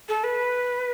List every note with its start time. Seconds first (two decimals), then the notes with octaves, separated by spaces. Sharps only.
0.09 A4
0.24 B4